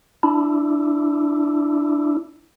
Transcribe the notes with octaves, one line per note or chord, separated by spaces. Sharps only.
D4 E4